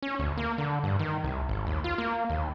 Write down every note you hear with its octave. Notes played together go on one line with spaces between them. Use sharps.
C#4
D2
A#3
D3
G2
D#3
C2
G#1
D#2
F4
A#3
D#2